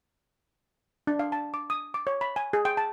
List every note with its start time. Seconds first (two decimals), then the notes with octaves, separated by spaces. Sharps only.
1.07 D4
1.19 F5
1.32 A5
1.54 D6
1.70 D#6
1.94 D6
2.07 C#5
2.21 B5
2.36 G#5
2.53 G#4
2.65 G5
2.77 A5